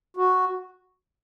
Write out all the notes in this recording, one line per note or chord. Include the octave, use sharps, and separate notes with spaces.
F#4